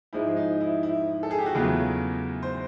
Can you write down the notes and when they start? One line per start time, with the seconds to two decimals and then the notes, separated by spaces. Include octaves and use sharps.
0.13 G#2 F3 G#3 E4
0.37 D#4
0.61 E4
0.83 E4
1.23 A4
1.31 G#4
1.39 G4
1.46 F#4
1.55 E2 C#3 F#3 A3 F4
2.43 C5